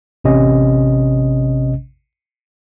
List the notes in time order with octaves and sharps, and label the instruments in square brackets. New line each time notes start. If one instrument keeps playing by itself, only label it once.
[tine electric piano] A1 C3 C#4 D#5